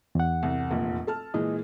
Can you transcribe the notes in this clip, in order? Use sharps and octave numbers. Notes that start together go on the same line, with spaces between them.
E2 F#5
C2
F1 A#1 A#2
A4 A5 F6
A#2 E3 G#3 D#5